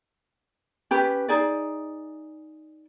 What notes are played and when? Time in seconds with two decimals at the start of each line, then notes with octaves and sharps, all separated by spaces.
0.91 C#4 G4 B4
1.28 D#4 G#4 D5